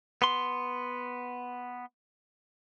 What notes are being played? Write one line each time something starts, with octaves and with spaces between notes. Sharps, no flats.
B3 C6